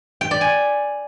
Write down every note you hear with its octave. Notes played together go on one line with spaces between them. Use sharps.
G5
D5
G#5